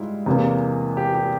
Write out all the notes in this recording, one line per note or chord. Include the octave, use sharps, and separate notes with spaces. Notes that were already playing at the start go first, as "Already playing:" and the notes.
Already playing: G#2 G3 E4 F4
E2 C3 E3 A#3
G4
G4